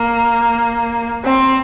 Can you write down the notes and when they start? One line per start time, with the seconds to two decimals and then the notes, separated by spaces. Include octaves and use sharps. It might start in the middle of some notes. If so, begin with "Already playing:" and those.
Already playing: A#3
1.25 C4